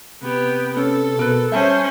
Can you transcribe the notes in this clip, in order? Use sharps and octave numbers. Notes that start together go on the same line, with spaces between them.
C3 B3 G4
C#4 A4
B2 A#4 B4
G3 C#4 C5 E5 A5